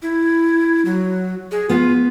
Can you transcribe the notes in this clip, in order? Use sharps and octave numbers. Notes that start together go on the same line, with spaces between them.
E4
F#3
G#4
B3 F4